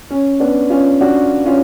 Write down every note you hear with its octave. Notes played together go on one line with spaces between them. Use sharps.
C#4
B3 D4
C#4 F4
D4 F#4
C#4 F4